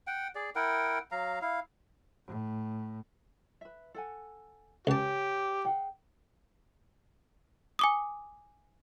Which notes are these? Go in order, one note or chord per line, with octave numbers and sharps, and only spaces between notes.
F#5 G5
G#4 D5
E4 A#4 F#5 G5
F#3 F5 A#5
E4 F5
A2
B4 E5
A4 F#5 G#5
C#2 G4 C#5 G#5 A5
G#4 F#5 G5
G#5 D6 D#6